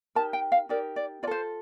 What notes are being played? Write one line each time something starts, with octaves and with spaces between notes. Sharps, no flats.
D#4 G4 A#4 A5
G5
F5
D#4 G4 A#4 D5
D5
F4 A4 C5 D5